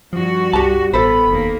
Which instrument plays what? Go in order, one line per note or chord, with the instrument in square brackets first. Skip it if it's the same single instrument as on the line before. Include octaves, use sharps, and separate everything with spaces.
[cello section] G2 F#4 [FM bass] F3
[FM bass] C2 [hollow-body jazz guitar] G4 A5
[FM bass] A1 [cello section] B3 [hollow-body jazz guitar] A4 C5 [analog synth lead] B5
[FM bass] F1 [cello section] D#2 A#3